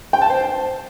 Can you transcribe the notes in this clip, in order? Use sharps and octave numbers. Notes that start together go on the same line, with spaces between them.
G5
A5
C5